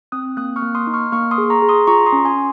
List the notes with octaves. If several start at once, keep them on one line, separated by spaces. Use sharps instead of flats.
C4 D#6 F#6
A#3 D#6 F#6
C#6 F6
A#3
C6 D#6
D#4
C#6 F6
A#3 C#6 F6
C6 D#6
G#4
A#5 C#6
G#4
C6 D#6
F4 A#5 C#6
C6 D#6
C#4
G#5 C6